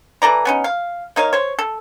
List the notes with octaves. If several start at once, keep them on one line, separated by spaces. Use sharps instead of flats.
E3 A4 D5 A#5
B3 C#4 D#4
F5
A#3 D#4 C#5 F5
C5 C#5
A4